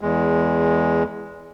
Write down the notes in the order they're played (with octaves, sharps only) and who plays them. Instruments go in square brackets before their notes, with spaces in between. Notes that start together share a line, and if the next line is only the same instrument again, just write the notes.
[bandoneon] E2 G#3